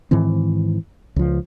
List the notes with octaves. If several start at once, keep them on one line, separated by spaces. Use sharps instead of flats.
G#2 D#3 E3 C4
C#2 F3